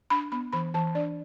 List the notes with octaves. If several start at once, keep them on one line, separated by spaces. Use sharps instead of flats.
D4 B5
B3 B5
E3 B5
E3 A5
D4 D5